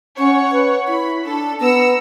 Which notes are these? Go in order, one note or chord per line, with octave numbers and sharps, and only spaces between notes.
C#4 C#5 F#5 C#6
B4
E4 B5
D4 A4
B3 A#5 E6 C#7